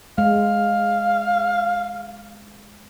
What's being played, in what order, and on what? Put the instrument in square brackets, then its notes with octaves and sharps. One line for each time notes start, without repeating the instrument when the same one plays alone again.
[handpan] G#3 [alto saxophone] F5